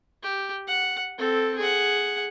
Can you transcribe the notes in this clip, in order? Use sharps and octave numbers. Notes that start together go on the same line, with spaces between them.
G4
F#5
C4 A4
G#4 F#5